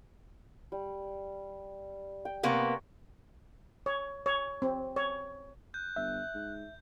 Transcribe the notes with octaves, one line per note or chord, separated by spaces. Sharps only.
G3
G5
C3 A#3 B3 B4 C#6
C#5
C#5
C4
C#5
F#6 G6
G1 E5
G#2